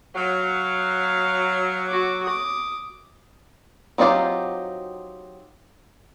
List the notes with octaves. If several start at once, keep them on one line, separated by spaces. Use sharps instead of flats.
F#3 F5
F#4 D6
D6 D#6
F#3 C4 D#4 F4 G4